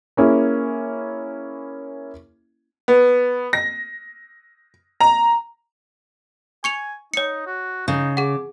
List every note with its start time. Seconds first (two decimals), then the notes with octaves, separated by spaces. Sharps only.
0.17 A#3 C#4 E4 G#4
2.88 B3
3.53 A#6
5.00 A#5
6.64 G#5 C#6 C#7 F7
7.14 D#4 C#5 C#7
7.46 F#4
7.88 C#3 D#4
8.17 G#4 F#5 D6